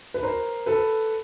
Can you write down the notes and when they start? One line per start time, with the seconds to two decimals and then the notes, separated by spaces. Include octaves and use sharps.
0.14 B4
0.23 A#4 C5
0.66 A4 B4